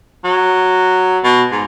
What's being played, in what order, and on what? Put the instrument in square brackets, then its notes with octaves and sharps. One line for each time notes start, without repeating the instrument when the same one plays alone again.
[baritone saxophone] F#3
B2
G#2